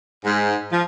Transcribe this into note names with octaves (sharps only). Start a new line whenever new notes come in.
G#2
F3